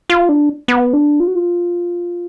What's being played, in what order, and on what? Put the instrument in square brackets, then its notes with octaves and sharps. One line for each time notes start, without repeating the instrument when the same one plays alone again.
[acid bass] F4
D4
B3
D4
F4
F#4
F4